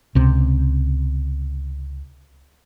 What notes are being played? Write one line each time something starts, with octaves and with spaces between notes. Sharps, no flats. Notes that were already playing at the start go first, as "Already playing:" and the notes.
C#2 C3